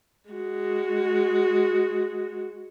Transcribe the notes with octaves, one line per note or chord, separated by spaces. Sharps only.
G#3 F#4